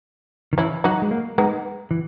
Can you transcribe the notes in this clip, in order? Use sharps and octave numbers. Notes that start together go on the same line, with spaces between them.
D#3
E3 C#4 E4
F#3 D#4 F#4
G#3
A#3
G#3 B3 D#4
E3